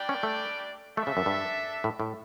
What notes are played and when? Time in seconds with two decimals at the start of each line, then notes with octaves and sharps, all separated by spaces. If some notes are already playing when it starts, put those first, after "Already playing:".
Already playing: G3 D4 G4 D5 G5
0.09 C#4
0.23 A3
0.97 A3 D4 A4 E5
1.07 C#3
1.17 F#2
1.26 G2
1.84 A2
2.00 A2